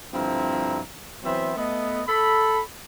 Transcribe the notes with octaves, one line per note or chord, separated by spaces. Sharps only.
G2 D3 F3 C4 E4 A#5
E3 F#3 B3 C4 C5 E5
A3 B3 D#5
A4 B5